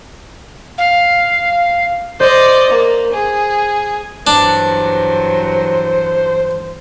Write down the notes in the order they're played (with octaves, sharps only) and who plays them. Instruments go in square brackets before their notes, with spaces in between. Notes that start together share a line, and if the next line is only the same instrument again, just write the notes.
[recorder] F5
[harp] C5 [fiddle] D5 D#5
[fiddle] A#3
G#4
[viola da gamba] G2 E3 F#3 [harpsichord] D4 [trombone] C5